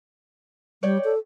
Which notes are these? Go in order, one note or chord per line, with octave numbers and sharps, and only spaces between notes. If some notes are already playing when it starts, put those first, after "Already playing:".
G3 C#5 D5 G5
A4